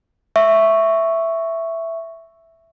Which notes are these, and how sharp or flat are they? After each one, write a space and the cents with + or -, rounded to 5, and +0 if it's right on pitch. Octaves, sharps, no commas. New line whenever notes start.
E5 +0 C#6 +0